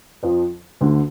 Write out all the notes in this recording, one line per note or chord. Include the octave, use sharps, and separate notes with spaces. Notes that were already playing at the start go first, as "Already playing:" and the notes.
F2 F3
D2 D3